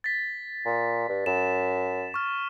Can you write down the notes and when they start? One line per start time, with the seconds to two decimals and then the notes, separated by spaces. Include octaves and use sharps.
0.04 A6 B6
0.66 A#2
1.09 G2
1.26 F#2 E7
2.14 C#6 F6